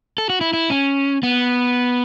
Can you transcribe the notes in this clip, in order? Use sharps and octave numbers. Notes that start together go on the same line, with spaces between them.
A4
F#4
E4
E4
C#4
B3